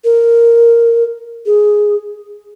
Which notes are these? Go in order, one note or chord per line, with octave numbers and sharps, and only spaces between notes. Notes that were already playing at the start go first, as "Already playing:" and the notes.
A#4
G#4